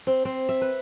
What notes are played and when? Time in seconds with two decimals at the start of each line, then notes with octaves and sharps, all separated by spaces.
0.07 C4
0.25 C4
0.49 E5
0.61 B4